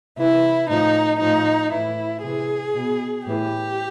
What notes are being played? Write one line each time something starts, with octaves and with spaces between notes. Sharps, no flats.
C3 E3 E4
A2 F3 D#4
A2 F3 D#4
A2 E3 E4
C3 E3 G#4
B2
A2 E3 G4